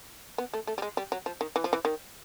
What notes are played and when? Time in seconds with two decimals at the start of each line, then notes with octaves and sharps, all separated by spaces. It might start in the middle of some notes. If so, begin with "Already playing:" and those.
0.38 B3
0.54 A3
0.67 A3
0.78 G3
0.82 G#3
0.97 G3
1.12 F#3
1.26 F3
1.41 D#3
1.56 E3
1.64 F3
1.73 E3
1.85 D#3